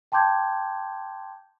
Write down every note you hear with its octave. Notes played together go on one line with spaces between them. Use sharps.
G5 A5 C6 D6 G6 G#6